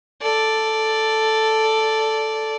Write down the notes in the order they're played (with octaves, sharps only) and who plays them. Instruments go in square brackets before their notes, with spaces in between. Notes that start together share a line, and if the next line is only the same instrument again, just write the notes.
[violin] A4 D5